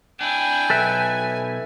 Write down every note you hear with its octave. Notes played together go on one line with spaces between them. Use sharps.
D4 E4 G5 G#5
B1 A4 B4 E5